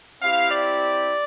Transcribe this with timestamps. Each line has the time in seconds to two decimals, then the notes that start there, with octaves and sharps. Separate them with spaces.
0.22 C4 E4 G4 F5
0.51 D5